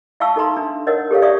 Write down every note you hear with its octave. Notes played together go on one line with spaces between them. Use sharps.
E5 F5 A5 C#6 E6
D#4 A4 E5 A#5 C6
D4
A#4 C#5 D#5 F#5 E6
G4 A4 C#5 F5
D5 E5 F5 C#6 D#6